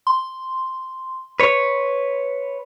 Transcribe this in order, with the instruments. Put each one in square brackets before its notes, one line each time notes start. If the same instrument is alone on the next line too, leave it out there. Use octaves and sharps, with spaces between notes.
[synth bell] C6
[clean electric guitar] B4 C#5